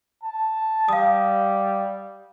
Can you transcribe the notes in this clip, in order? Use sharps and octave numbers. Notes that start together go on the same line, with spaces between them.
A5
G3 F5 D#6